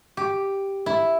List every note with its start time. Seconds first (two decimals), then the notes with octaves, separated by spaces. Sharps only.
0.17 G4
0.86 E4